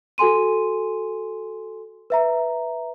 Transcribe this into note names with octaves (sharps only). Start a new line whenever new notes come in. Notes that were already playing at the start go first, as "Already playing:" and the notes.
F#4 A4 G#5 C6 D#7
B4 E5 A#5